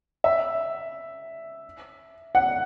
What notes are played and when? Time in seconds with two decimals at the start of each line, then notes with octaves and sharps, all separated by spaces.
0.24 E5
2.35 F#5